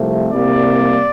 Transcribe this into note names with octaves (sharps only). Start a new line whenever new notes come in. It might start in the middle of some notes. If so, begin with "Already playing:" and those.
Already playing: C2 C3 F3 A3
C2 C3 G3 A#3 D5